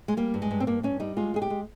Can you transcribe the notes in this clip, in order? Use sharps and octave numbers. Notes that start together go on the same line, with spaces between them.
G#3
G3 A#3
G2
G#3
G2
C4
G2 A#3
G2 C#4
G3 D#4
G#3 F4
G#3 G#4
G4
G#3